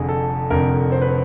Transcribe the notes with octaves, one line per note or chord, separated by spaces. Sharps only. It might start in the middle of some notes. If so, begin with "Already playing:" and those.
Already playing: F1 F2 D3 G#4
A4
F1 F2 D3 A#4
C5
B4